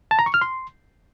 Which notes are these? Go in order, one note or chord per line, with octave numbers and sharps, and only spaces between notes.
A5
A#5
C#6
F6
C6